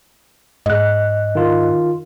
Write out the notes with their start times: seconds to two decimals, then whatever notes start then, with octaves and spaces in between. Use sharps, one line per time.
0.66 G#2 D#5 F#6
1.35 D#3 F4